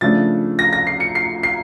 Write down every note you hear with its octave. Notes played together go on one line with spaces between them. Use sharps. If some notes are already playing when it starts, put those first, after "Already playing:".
C#3 F3 A3 D4 A6
A#6
A#6
C7
C#7
C7
C7